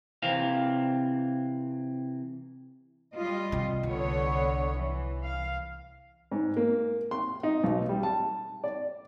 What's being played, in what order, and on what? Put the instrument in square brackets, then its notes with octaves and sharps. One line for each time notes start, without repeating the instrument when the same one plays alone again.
[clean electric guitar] C3 E3 C4 F5
[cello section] G3 F4 D#5
[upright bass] C3
[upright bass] C2 [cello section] D3 B3 C#5
[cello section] E3
F5
[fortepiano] G#2
A#3
C6
D#4
B1
G3
A5
D5